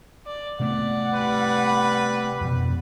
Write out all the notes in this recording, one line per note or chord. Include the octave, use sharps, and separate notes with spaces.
D5
C3 A3 B3 D5 F#5
G3 B4 B5
F2 B2 F3